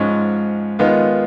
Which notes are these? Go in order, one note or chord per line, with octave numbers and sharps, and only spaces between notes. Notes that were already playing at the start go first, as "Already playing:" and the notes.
Already playing: G#2 F3 G#3 C#4
D#3 G#3 B3 F4